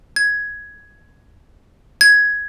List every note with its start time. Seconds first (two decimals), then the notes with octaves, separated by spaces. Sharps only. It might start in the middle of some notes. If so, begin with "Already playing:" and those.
0.16 G#6
2.01 G#6